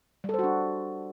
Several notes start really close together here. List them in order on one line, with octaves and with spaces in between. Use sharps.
G3 A4 C5 F#4 D4